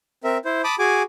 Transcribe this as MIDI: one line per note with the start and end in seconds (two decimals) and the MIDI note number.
0.24 0.38 60
0.24 0.38 70
0.24 0.38 76
0.45 0.62 64
0.45 0.62 72
0.64 0.75 81
0.64 0.75 83
0.64 0.75 86
0.64 0.75 87
0.79 1.03 66
0.79 1.03 68
0.79 1.03 80
0.79 1.03 86